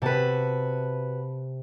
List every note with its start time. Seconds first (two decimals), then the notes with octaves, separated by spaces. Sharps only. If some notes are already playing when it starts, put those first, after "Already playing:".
0.02 C3 F#4 B4 A5